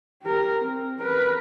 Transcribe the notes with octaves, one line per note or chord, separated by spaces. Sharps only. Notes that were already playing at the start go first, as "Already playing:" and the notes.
G4 A#4
C4
A#4 B4